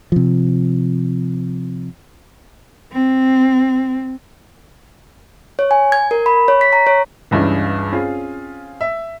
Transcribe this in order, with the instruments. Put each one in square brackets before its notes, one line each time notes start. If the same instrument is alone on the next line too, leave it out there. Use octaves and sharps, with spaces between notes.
[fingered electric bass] C3 F3
[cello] C4
[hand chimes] C#5
G#5
G#6
A#4
B5
C#5
B6
A#5
C#5
[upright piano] C#2 G2 C#3 E3 C#4
C4 C#4 F4 G#4
E5